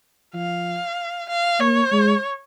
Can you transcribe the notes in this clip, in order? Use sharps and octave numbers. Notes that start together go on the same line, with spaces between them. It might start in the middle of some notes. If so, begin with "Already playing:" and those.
F3 F5
F5
A#3 C#5
G#3